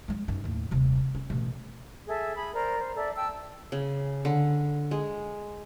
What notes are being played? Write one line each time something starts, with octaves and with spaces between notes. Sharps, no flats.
F#3 G#3
F#2 D#3
D#2 A2
D#1 C3
C#4
A1 B2
G#4 A4 E5
G#4 B5
A#4 C5 D5 A#5
C5
A4 D5 E5
G5 A5 E6
C#3
D3
G#3